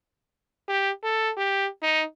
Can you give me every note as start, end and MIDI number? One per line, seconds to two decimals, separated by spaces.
0.69 0.91 67
1.03 1.30 69
1.37 1.67 67
1.83 2.03 63